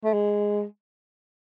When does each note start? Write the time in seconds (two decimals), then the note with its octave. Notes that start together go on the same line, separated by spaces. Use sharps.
0.04 A3
0.13 G#3